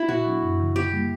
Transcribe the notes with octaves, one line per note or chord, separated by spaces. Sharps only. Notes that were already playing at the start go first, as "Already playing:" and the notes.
Already playing: E4
A#2 F#4
F#3 B3 D4
F#2
C#3 E3
D3 G4
G3 A#3